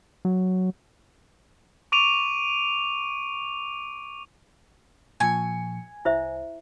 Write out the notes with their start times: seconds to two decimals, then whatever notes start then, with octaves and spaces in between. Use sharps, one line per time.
0.25 F#3
1.92 C#6 D6 D7 D#7 F7
5.20 A#2 F3 G#5 C#7
6.05 C2 E4 C5 E5